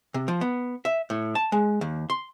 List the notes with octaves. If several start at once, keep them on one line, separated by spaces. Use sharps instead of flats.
C3
F3
B3
E5
A2
A5
G#3
D#2
C6